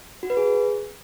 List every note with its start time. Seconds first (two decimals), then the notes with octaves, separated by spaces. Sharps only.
0.23 F#4
0.30 B4
0.37 G#4